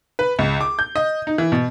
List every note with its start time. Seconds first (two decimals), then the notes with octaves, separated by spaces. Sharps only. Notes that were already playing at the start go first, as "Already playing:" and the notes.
0.19 B4
0.39 C#2
0.61 D6
0.79 G6
0.96 D#5
1.27 D#4
1.38 E3
1.52 B2